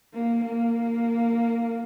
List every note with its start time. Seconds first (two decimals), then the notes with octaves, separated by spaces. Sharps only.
0.14 A#3
0.44 A#3